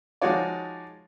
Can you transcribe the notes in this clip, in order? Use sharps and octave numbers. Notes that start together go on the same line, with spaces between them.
F3 G#3 D#4 F#4 C#5 D5